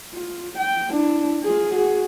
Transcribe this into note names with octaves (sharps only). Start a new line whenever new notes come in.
F4
G5
D4 E4
F4 G#4
F#4 G#4